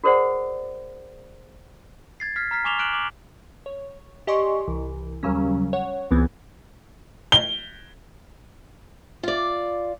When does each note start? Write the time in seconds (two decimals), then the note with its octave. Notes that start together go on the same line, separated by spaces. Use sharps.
0.04 F#4 G#4 A#4 C5 D5 F#5
2.20 G#6 A6 C7
2.36 F6 G#6 B6 C7
2.51 A#5 F6 B6 C7
2.64 G#5 C#6 D6 E7 F7 G7
2.79 F6 F#6 D7 E7 F#7 G7
2.93 D6 F#7
3.66 C#5
4.27 G4 D5 D#5 G#5 C6 C#6
4.68 C2 E3
5.23 D#2 C#3 F#3 G3 C#4
5.73 C#5 F#5
6.11 C#2 E3 B3 C4 G#6
7.32 G7
9.23 F4 D5